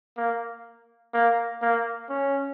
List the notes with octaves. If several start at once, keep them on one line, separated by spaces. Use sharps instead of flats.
A#3
A#3
A#3
C#4